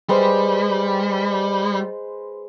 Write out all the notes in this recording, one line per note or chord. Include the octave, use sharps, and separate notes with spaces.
G3 G#3 B4 C5